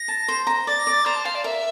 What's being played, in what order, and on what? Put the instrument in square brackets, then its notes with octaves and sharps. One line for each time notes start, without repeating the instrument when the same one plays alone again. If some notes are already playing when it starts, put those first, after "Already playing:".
Already playing: [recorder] A#6
[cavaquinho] A5
C5
A#5
[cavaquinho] D5 [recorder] A6
[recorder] A#6
[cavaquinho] D5
[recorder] A6
[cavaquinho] C5 [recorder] A#5
[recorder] A5
[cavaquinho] C5 [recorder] F5
[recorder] D5
[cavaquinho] A#4 [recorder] E5